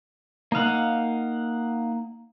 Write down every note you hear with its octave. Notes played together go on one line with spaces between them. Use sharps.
A#3 D#4 F5 F#5